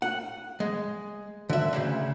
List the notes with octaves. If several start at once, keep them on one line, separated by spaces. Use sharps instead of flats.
F#5
G#3
D3 E5
D2 G2 C#3